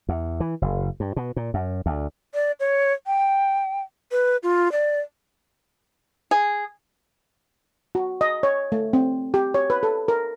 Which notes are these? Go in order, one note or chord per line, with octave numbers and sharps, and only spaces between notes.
E2
E3
F#1
G2
B2
A#2
F#2
D2
D5
C#5
G5
B4
F4
D5
G#4
F#4
D#5
C#5
A3
C4
G4
C#5
B4
A4
A#4